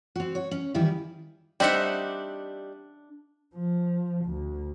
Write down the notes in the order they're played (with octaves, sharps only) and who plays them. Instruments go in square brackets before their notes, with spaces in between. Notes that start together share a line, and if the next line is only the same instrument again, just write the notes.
[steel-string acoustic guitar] C4 F#4
C#5
C#4
D#3 E3 G3 E4 F4
[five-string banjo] G3 C4 D#4 [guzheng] D4 E5 F#5
[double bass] F3
D2